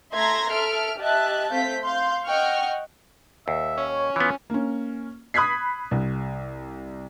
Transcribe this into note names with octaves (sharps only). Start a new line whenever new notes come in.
A3 E5 A#5 C6 G#6 A#6
A4 E5 F6 D7
G4 D#5 E5 A5 F#6
A3 C4 F5 G6 B6
F5 C6 G6
D#5 F#5 G5 C#6 F6
D#2 E5
C#4
C#5
E3 B3 F4
A#3 C#4
B5 D#6 F#6 G#6 B6 C7
C2